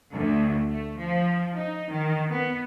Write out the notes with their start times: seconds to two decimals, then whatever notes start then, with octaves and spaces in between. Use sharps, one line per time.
0.13 D2
0.66 A3
0.97 F3
1.55 D#4
1.92 D#3
2.30 B3